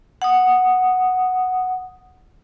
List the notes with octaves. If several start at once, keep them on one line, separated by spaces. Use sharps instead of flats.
F#5 D#6